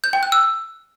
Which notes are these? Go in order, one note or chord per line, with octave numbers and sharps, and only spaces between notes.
G6
G5
F#6
E6